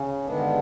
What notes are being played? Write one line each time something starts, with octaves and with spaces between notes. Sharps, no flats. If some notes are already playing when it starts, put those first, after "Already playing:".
Already playing: C#3 C#4
G2 D3 D#3 G#3 B3 D4